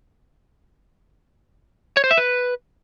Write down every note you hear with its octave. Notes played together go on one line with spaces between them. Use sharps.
C#5
C5
E5
B4